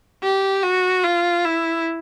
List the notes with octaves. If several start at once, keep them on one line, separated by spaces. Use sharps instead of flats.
G4
F#4
F4
E4